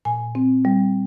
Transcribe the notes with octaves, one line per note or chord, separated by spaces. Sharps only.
A#2 G#5
C4
G3